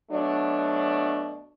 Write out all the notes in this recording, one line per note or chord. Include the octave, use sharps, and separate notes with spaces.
B2 F#3 A3 D4